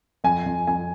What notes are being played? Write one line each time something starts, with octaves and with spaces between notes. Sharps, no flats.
F2 G#5
F2
F2 G#5